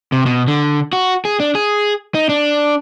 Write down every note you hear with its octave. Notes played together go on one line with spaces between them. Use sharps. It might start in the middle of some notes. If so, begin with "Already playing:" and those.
C3
B2
D3
F#4
G#4
D4
G#4
D#4
D4